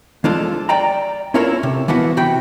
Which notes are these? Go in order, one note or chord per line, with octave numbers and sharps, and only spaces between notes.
F3 G#3 D4 F4 A4
D5 G5 A#5
C#4 E4 F4 A4 A#4 C#5
C3
E3 F3 B3 E4 F#4
C3 F#4 G5 B5